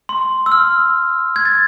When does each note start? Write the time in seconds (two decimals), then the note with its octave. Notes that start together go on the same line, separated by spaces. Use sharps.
0.09 C6
0.46 E6
0.52 F6
1.36 G#6
1.45 A6